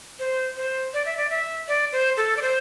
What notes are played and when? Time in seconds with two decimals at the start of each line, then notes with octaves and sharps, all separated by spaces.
0.19 C5
0.57 C5
0.94 D5
1.06 E5
1.17 D5
1.30 E5
1.68 D5
1.92 C5
2.17 A4
2.37 D5
2.42 C5